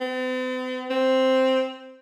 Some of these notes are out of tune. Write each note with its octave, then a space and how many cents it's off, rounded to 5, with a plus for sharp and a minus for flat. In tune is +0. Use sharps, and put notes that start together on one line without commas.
C4 -45
C4 +0